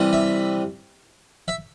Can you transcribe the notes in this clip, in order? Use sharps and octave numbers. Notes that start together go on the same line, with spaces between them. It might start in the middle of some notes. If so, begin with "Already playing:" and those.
Already playing: C3 E3 G3
E5
E5